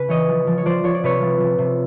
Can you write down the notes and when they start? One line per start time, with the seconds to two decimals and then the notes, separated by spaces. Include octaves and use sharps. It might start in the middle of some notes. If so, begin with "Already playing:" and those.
Already playing: C#3 B4
0.08 E3 C#5 D#5
0.28 F3
0.47 F3
0.58 C#5
0.66 F3 C5 D5
0.84 F3 C#5
0.95 D5
1.03 C3 B4 C#5
1.22 F3
1.40 F3
1.58 C3